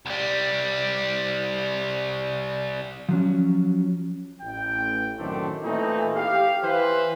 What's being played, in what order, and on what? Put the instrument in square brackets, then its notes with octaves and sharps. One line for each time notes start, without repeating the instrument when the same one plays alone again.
[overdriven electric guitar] C2 G3
[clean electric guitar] F3 F#3 C#4
[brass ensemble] A1 G5
F#2 A2 D#3 A3 C4 D4
A#2 E3 A3 C4 D#4
G4 F5
E3 B4 C5